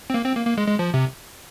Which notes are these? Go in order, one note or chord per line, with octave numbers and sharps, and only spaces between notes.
C4
A#3
C4
A#3
A#3
G#3
G#3
F3
C3